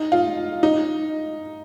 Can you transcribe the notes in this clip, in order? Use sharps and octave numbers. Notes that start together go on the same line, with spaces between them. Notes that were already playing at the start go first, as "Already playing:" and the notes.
Already playing: D#4
F4
D#4